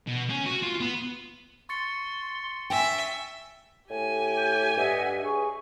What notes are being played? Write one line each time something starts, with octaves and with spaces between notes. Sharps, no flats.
B2
C#4
F#4
F4
B3
C6 C#6 A6 C#7
E5 G5 G#5
A2 G4 G#5
G6
G2 D#5 E5 F#5
G#4 C#5 C#6